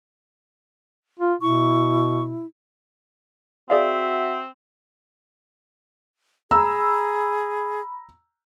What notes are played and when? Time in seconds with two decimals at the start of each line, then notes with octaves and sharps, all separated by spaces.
1.19 F4
1.42 B2 E4 C#6
3.70 C4 F#4 G#4 D5 E5 F5
6.51 G#4 A#5 B5 E6